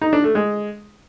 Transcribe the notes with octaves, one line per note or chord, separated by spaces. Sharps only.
D#4
D4
A3
G#3